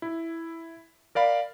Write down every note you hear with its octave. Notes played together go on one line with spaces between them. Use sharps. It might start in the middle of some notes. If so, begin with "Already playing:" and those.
E4
A#4 D5 F5 B5